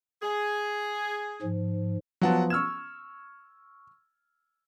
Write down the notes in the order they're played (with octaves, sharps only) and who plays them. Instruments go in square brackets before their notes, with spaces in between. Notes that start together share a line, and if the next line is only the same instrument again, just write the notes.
[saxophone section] G#4
[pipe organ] G#2 F3
[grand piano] F3 B3 F4 [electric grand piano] F#3 F#5 A5
[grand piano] C#6 F6 G#6 [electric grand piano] E6 E7